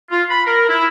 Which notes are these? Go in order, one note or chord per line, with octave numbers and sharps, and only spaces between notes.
F4
B5
A#4
E4